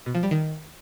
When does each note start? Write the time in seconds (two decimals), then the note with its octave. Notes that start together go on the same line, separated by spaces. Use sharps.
0.06 B2
0.15 F3
0.23 G3
0.31 D#3